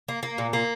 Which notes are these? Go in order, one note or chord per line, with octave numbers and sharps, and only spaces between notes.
A#3
A#3
A#2
A#3